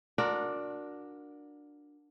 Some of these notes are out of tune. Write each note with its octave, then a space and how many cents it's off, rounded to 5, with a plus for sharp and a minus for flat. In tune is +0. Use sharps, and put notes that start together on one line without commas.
D4 +5 F#4 -30 A#4 +0